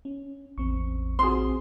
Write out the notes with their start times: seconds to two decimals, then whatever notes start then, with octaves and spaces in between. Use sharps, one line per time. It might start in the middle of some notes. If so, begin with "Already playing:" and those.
0.05 C#4
0.58 A1 E2 C4 C#6
1.19 C4 F#4 G#4 C6